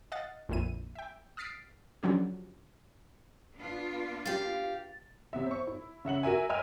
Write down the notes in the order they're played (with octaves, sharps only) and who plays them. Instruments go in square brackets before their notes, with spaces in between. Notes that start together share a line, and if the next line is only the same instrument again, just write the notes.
[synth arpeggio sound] D#5 F5 F#5 A6
A#1 F2 A#2 D3 E4 D#7
E5 G5
D#6 F6 A6 B6 C7 D7
D3 F3 F#3 C#4 G4
[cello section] B3 D4 F4
[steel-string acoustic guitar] G4 F5 [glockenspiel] A6
[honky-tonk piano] C3 B3 E5
C5 C#6
E4
C#3 E5 F#5 F#7
F#4 A#4 E5 G#5
D#5 E5 G5 G#5 E6 F6